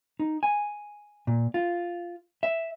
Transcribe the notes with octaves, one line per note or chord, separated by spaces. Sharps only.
D#4
G#5
A#2
F4
E5